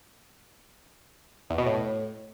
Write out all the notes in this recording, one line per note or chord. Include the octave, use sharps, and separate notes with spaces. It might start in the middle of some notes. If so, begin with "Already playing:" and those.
E2
B2
A2